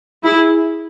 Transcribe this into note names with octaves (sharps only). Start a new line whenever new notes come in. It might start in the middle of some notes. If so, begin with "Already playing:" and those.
E4 G#4